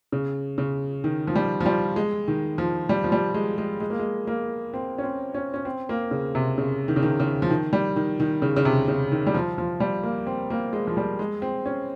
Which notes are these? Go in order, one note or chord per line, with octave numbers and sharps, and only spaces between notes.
C#3
C#3
D#3
F3
G3
F3
G3
G#3
D#3
F3
G3
F3
G3
G#3
G#3
G#3
A#3
G#3
A#3
C4
C#4
C4
C#4
C#4
C4
A#3
C#3
C3
C#3
D#3
C#3
D#3
C#3
F3
D#3
G3
D#3
D#3
C#3
C#3
C3
C#3
D#3
G3
F3
F3
G3
A#3
C4
A#3
G#3
F3
G3
G#3
C4
C#4